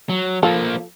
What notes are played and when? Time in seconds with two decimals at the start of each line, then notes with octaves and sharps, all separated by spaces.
0.09 F#3
0.43 F3 A#3 F4 A4